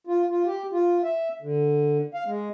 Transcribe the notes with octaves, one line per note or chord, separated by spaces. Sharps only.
F4
F4
G4
F4
E5
D3
F5
G#3